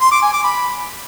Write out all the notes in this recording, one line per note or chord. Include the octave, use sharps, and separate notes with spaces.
C6
D6
G#5
D6
B5